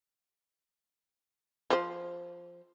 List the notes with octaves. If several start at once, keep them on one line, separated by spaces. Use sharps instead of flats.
F3 C5